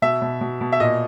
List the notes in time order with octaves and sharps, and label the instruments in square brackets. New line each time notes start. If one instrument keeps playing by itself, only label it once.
[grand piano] B2 E5
B2
B2
B2
E5
A#2 D#5